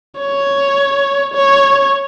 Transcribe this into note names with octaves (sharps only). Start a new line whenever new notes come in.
C#5
C#5